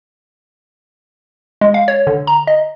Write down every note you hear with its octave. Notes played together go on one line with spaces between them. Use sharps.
G#3
F5
C#5
D3
A#5
D#5